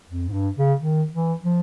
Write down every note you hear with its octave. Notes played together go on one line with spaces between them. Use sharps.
F2
G#2
G2
C#3
D#3
E3
F3